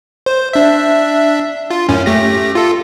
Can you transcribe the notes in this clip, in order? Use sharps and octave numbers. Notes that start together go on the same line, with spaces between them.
C5
D4 E5
F4
F#2 A2 C#4
A3 G4 A#6
F4 A4